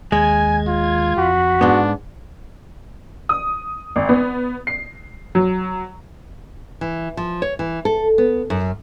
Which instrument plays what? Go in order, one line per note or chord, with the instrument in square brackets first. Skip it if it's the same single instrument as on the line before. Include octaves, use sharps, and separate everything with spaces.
[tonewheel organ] D#2 G#6 [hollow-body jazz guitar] G#3 [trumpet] G#5
[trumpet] F4
[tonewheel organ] F2 B5 [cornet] F#4
[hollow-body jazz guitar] G#2 B3 [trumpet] D4
[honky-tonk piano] D#6
G#1
B3
C7
F#3
[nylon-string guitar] E3
F3
C#5
E3
A4
B3
F#2